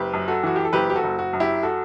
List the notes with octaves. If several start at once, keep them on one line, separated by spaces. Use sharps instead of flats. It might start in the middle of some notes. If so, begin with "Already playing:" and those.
Already playing: F#1 G4 B4
F#2
F#4 A4
E3 F#4
G4
A4
F#1 G4 B4
G4
F#4 A4
F#1
F#4
F#2
E4 G4
F#4 A4